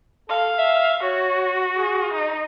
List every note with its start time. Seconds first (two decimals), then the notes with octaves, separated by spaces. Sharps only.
0.29 A4 F5
0.58 E5
1.03 F#4 C#5
1.75 G#4
2.13 D#4